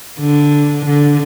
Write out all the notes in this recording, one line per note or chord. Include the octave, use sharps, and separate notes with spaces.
D3
D3